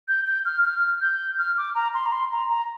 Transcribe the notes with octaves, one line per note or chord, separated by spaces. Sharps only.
G6
G6
F6
F6
G6
F6
D6
A#5
C6
A#5
C6
A#5
A#5